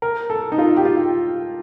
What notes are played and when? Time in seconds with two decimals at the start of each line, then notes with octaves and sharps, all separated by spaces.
0.02 A#4
0.30 A4
0.52 D#4
0.58 F4
0.77 G4
0.85 F4